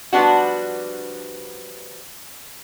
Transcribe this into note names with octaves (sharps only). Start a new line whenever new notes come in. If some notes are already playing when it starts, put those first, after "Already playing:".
F3 G3 B3 D4 F#4